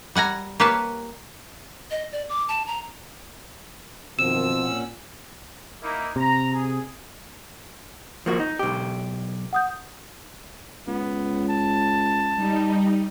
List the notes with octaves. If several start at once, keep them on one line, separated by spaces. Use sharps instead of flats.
G3 F#5 G#5 A#5
A#3 G4 B4 C#5 F5 A5
D#5
D5
D6
A5
A#5
F#2 B2 D#3 F3 C4 E6 E7
A#2 C#4 F#5
A#3 D#4 E4
C3 A#5
G#4
F3 A#3 F#4
D#4
B1 G4
F#5 D#6 G6
C#2 B3
A5
G3 D#4